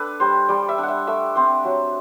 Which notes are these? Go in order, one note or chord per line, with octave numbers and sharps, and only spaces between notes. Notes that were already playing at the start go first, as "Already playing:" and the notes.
Already playing: D4 A4 B4
G3 C5
G3 D5
E5
D4
E5 F#5
A3 E5
C4 C5
F#3